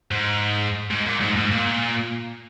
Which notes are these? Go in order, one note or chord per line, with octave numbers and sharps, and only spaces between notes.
G#2
G#2
A#2
G#2
G#2
A#2